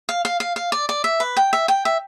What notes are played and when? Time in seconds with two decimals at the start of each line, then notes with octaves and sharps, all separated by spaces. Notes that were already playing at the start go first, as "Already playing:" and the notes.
0.09 F5
0.25 F5
0.40 F5
0.56 F5
0.72 D5
0.89 D5
1.04 E5
1.20 B4
1.37 G5
1.53 E5
1.68 G5
1.85 E5